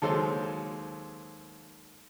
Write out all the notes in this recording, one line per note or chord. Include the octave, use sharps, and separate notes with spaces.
D#2 F#3 G#3 A4 C5